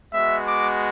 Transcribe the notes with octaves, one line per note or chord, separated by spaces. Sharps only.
G#3 B3 F#4 E5
D6